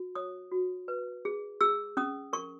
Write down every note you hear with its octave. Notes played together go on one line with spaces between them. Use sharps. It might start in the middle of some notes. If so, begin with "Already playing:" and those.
Already playing: F#4
C#5 D#6
F#4
B4
G#4
G#4 E6
C#4 D#6
A#4 C#6